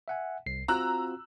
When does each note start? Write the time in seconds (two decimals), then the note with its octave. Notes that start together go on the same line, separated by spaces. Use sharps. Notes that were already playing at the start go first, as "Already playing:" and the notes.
0.08 E5 F#5 G#5
0.46 C2 C7
0.68 C4 F4 F#4 A#5 E6 F#6